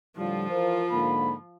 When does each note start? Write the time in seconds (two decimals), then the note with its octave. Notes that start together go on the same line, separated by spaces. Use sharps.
0.17 A2 D3 F3 G3 F4
0.51 E3 A#4 C5
0.91 G#2 D3 A#3 B5